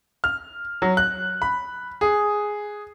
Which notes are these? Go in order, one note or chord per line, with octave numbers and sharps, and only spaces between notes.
F6
F#3
F#6
B5
G#4